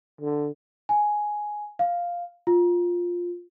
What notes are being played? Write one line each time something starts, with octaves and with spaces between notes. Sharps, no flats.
D3
G#5
F5
F4